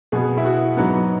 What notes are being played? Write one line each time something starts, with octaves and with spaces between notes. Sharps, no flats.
B2 B3 G#4
E4
F#4
G#2 F#3 B3